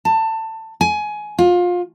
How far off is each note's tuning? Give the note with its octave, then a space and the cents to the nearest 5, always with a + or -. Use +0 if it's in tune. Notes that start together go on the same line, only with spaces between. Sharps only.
A5 +20
G#5 +20
F4 +25